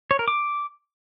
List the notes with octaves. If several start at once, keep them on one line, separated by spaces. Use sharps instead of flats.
C#5
A#4
D6